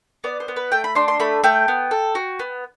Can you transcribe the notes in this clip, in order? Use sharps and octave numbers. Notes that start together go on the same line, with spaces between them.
B3 D5
C5
B3
B4
A3 G5
B5
D4 C6
C6
A3 B5
A3 G5
B3
A4
F#4
B3